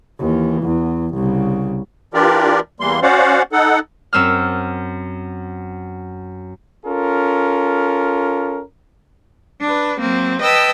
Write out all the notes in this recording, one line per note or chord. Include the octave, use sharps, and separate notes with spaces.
D#2 E3
E2
C2 C#3
E3 D4 F4 G4 A#4 D5
E2 E3 G3 A#3 C6
C#4 F#4 C5 D5 F5 F#5
D#4 A4 F#5
F#2 C4 E6 F6
C#4 F4 A4 A#4
D4 B4
F#3 A#3 C4
B4 D#5 G5 A5 E6